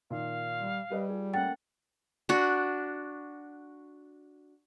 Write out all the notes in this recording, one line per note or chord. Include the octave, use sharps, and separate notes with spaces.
A#2 D#3 F5
G3
G3 G4 B4 D#5
F4 G#4
A3 A#3 C#4 F#5 G5 A6
D4 F#4